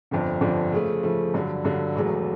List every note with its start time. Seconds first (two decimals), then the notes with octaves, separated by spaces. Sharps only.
0.11 G1 F2 D3 F3
0.41 G1 F2 D3 F3
0.72 C#3 F3 A3
1.03 C#3 F3 A3
1.34 G2 D3 F#3
1.65 G2 D3 F#3
1.96 E1 E2 C#3 F#3 A3